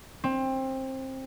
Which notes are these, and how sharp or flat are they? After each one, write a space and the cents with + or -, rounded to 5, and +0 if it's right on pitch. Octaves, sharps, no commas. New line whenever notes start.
C4 +20